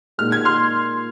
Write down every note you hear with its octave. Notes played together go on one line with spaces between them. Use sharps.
A#2 G#3 D#4 F6
G#6
C6 F6